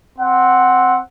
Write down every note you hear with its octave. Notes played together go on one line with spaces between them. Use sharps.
C4 F#5